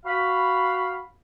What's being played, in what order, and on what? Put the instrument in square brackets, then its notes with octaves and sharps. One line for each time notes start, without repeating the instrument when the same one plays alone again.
[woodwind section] F#4 F5 B5